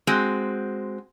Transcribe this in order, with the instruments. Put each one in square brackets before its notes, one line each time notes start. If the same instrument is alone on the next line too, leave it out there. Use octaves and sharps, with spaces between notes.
[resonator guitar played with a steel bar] G#3 C4 F#4